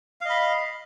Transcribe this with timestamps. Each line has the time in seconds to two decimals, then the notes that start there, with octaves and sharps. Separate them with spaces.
0.21 F5
0.25 D#5
0.29 B5